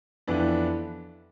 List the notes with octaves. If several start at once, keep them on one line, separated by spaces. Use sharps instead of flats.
F2 E3 B3 D4